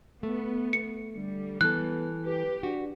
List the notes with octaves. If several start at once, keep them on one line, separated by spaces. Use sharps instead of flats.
A3 B3
C#7
D3 G3
E3 B3 A4 F#6
G4 B4
D4 F#4